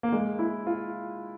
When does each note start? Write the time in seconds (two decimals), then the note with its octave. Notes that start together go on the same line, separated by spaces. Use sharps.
0.03 A#3
0.12 G#3
0.39 E4
0.67 F4